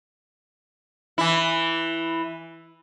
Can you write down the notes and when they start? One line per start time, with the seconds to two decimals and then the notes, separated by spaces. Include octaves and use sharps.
1.18 E3 E4